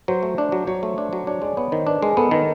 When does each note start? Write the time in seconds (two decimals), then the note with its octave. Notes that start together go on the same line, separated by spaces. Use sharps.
0.08 F#3 C5
0.23 A3
0.38 D4
0.52 F#3
0.67 F#3 C#5
0.83 A3
0.98 D4
1.13 F#3
1.27 D4 C#5
1.42 G#3 D5
1.57 B3 C#5
1.72 D#3 C5
1.87 D4 B4
2.02 G#3 A#4
2.17 B3 A4
2.31 D#3 A#4